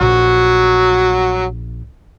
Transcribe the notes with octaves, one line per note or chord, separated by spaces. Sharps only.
A#1 F#3 F#4